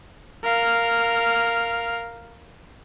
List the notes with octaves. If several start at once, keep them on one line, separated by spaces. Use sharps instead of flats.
A#4 F5